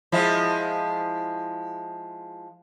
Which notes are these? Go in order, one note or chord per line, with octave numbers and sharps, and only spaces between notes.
F3 G#3 E4